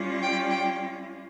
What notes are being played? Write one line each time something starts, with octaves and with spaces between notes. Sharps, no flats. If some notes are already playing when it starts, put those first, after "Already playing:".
Already playing: G3 C#4 F4
G5
G5